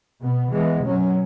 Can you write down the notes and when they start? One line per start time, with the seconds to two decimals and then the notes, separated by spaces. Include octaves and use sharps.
0.22 B2 B3
0.52 E3 G#3 B3
0.84 B2 F#3 C#4